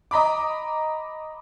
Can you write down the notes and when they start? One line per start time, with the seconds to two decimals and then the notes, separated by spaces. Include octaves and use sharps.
0.11 D#5 A#5 B5 D6